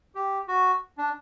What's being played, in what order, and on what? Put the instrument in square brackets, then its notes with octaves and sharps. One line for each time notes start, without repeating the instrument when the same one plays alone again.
[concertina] G4
F#4
D4